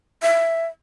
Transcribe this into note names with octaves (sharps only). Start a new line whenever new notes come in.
E5